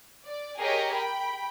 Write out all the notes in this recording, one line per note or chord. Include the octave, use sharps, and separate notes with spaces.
D5
G4 G#4 A#4 C#5 D#5
G5 B5